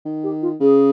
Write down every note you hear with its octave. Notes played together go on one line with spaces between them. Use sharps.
D#3
G4
F4
C#3 G#4